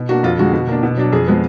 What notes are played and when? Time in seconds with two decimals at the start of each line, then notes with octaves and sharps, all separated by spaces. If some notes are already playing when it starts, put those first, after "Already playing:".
Already playing: B2
0.09 A#3 D4 F#4
0.23 F2 F4
0.38 D3 G#3 F#4
0.53 B2
0.67 A#3 D4
0.83 B2
0.97 F#3 D4
1.12 F2 G#4
1.28 F3 G#3 B3